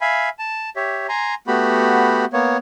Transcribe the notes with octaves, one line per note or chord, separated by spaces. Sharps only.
E5 F5 G#5 B5
A5
G4 C#5 E5
G#5 A#5 C6
A3 B3 F#4 G4 B5
A#3 B3 C#5